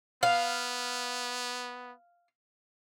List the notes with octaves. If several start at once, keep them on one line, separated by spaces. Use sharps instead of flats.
B3 F5